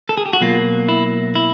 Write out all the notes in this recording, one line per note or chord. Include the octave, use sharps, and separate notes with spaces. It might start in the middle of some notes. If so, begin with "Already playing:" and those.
A4
G#4
G4
F#4
B2 F#3 A#3 F4
E4
E4